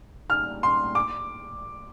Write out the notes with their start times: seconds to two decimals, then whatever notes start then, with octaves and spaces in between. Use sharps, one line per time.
0.30 F6
0.63 C6
0.95 D6